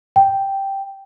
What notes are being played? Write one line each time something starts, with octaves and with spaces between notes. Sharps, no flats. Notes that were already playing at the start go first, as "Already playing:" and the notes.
G5